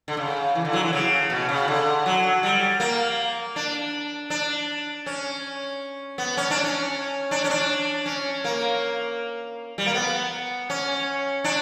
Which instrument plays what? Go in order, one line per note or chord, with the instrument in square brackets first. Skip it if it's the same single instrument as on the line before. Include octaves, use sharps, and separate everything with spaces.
[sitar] D3
C#3
E3
D3
F#3
E3
C#3
B2
C#3
D3
F#3
G3
A#3
D4
D4
C#4
B3
C#4
D4
C#4
D4
C#4
D4
C#4
A#3
G3
A#3
B3
C#4
D4